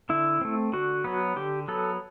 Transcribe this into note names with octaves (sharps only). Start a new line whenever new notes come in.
D3 E4
A3 C4
D3 F#4
F#3 B3
D3 G4
F#3 B3 A4